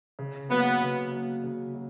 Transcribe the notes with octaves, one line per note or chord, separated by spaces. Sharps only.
C#3
F#3 A#3 B3
C#3
F#3 A#3
C#3
F#3